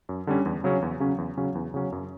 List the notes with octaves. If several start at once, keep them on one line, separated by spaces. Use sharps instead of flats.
F#2
D3 G3 C#4
E2
C#3 F#3 C#4
E2
C#3 F#3 C#4
E2
C#3 F#3 C#4
E2
C#3 F#3 C#4
F#2